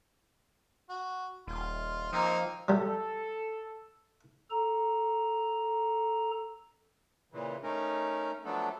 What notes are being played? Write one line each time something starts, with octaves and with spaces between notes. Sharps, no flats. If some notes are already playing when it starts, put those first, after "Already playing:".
F#4
D#1 F4
F3 A#3 C4 D#4
F#3 G3 A4
A4 A#5
A#2 C#3 E3
A3 C#4 D#4 A#4
F3 F#3 A3 B3 D4 A4